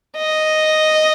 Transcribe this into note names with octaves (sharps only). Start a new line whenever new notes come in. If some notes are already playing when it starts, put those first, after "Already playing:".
D#5